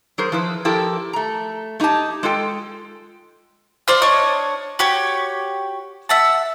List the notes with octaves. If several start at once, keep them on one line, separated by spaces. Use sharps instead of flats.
F#3 G#4 A#4 C5
F3 E4 B4
F3 E4 G4 A4 A#4
A3 A#5
A3 D#4 E4 G4 A5
G#3 F4 A4 G5
F4 C5 D5
D4 C#5 D#5 C#6
F#4 G4 C#5
E5 F#5 A5